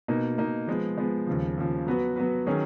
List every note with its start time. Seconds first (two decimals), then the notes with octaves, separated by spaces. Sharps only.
0.08 B2 A#3 D#4
0.38 B2 A#3 D#4
0.67 F3 G#3 B3
0.98 F3 G#3 B3
1.27 D#2 C#3 F3
1.57 D#2 C#3 F3
1.87 F#3 B3 F#4 B4
2.16 F#3 B3 F#4 B4
2.47 D#3 F#3 C#4 G#4 C#5